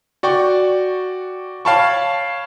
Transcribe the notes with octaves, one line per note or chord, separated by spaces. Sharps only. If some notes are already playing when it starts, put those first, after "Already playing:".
F#4 D5 G5 C#6
C#5 F5 G5 A5 B5 C#6